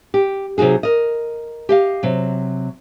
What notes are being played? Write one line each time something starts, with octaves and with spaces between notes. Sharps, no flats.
G4
C3 F#3 D#4 F#4 G#4
A#4 D#5
G4 D#5 F5
C3 F#3